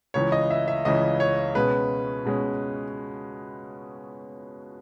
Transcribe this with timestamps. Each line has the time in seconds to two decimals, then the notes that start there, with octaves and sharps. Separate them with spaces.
0.14 C#2 C#3 E3 C#5
0.32 D#5
0.50 E5
0.68 E5
0.85 C#2 C#3 E3 D#5
1.20 C#5
1.55 B2 G#3 C#4 B4
2.25 B2 G#3 C#4